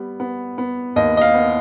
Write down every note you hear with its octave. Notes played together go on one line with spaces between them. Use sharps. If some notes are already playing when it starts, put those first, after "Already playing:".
Already playing: G3 B3
B3
B3
D#2 D#5
D#5
F5
B3